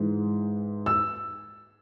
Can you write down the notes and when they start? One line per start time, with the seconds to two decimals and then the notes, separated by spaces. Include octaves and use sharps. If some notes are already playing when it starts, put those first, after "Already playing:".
Already playing: G#2 E3 G#3
0.86 E6